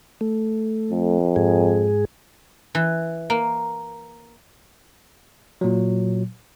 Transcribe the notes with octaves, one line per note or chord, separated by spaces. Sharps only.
A3
F2
G#2 G#4
E3
A#3
A#2 F#3